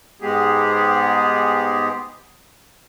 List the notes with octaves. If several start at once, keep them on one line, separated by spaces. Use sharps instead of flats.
G#2 G#3 B3 G4 G#4